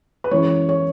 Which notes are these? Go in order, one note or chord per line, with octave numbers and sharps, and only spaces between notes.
B4
F#2 E3 G#3 C#5
C#5